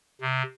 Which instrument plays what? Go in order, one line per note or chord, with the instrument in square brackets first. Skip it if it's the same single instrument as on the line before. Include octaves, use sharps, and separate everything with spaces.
[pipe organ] C3